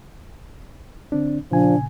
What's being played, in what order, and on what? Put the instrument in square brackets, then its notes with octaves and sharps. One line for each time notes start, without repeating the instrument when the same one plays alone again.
[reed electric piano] D3 C4 D4
[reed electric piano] A#2 C#3 G#5 [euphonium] F3 [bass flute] D4